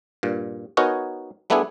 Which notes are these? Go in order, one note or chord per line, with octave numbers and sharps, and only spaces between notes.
G2 A#2
B3 D#4 F#4 A#4 C#5 G#5
G3 A3 B3 D4 E4 G#4